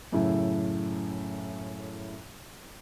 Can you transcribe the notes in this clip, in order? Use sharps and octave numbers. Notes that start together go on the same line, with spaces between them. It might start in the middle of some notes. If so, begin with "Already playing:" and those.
F#2 A2 C#3 A3 E4